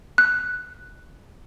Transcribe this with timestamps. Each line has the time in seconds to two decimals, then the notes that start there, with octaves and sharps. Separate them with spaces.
0.18 F#6